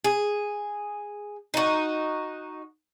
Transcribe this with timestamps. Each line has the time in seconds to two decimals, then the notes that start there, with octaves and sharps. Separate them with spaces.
0.04 G#4
1.54 D#4 F#4